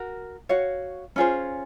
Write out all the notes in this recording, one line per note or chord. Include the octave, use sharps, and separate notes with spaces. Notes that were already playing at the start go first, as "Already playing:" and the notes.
Already playing: F#4 A#4 A#5
F#4 C#5 F5
C#4 F4 G#4 C5